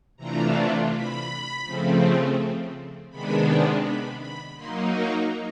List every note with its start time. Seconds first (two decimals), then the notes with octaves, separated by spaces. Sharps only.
0.17 C3 E3 A3 D4 F4 A#5
0.90 B5
1.63 C#3 F3 A3 C4
3.10 C3 D#3 G#3 B3 D4 B5
3.83 B5
4.20 B5
4.57 F#3 A#3 D#4 C6
4.94 C#6